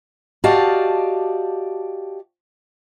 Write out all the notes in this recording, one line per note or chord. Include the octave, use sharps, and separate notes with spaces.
F#4 G4 D5 D#5 F5 A5